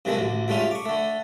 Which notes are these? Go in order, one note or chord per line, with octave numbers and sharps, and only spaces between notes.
G2 C3 D#3 E3 G#3 A3
A1 D2
G#2 G3 A3 C#4 F4
C#6 D6
D3 A3